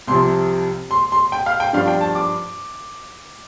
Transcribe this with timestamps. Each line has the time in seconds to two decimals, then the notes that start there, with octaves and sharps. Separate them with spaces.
0.07 C2 C3 F3 C6
0.91 C6
1.12 C6
1.32 G5
1.46 F5
1.60 G5
1.73 G2 F3 D4 F5
1.88 G5
2.01 A5
2.15 D6